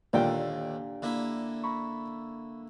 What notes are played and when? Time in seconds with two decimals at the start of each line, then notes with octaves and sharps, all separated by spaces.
0.13 D#2 A#2 D3 D4 G4 F5 G5
1.02 D3 A#3 E4
1.64 A#5 B5 C#6